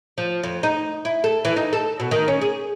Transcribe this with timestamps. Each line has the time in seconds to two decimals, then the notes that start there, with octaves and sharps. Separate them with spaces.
0.18 F3
0.43 F2
0.63 D#4
1.05 E4
1.24 A4
1.45 E3
1.56 D#4
1.73 A4
2.00 B2
2.11 D#3
2.28 C#4
2.41 G#4